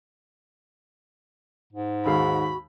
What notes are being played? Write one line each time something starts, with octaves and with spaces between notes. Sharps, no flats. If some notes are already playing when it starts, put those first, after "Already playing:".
G#2
D#2 G#3 F#4 F5 B5